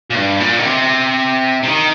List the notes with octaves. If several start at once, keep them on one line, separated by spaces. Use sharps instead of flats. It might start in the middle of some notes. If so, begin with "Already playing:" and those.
A#2
G2
A#2
D#3
C3
C3
D#3